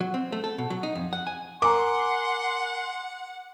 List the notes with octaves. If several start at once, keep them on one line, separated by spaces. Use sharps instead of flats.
F#3
C4
A3
A4
B2
F#3
D#4
F2
F#5
G#5
A#4 F#5 G#5 A#5 C6 D6